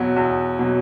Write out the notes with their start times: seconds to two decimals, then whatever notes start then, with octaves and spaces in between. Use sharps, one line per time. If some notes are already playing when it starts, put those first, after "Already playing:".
Already playing: E2 B2 F#3
0.16 E2
0.59 B2 F#3